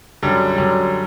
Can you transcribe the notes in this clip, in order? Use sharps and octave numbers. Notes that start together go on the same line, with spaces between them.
F#2 D3 G3
F#2 D3 G3